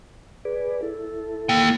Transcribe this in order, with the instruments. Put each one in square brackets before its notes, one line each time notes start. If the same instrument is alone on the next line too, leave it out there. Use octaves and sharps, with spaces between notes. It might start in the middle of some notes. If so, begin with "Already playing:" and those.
[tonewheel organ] G#4 B4 D5
E4 A4
[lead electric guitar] A#3 G5